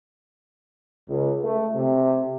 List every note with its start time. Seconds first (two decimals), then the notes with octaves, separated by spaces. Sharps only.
1.09 C#2
1.44 A3
1.75 C3